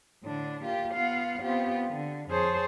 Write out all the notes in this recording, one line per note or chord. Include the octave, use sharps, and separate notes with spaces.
A2 D3 D4
A#3 F4 G4
B3 F4 F5 F#5
B3 C4 F4 G4
D3
F2 G#4 C5 C#5 A5